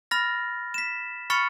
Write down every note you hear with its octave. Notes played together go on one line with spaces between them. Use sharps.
B5 F6 A6 A#6
B6 E7
B5 C#6 F6 A6 C#7